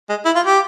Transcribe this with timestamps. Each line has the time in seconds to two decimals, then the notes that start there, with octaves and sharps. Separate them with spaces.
0.09 G#3
0.25 E4
0.35 F4
0.46 G4